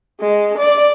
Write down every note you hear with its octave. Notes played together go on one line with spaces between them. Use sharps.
G#3
D5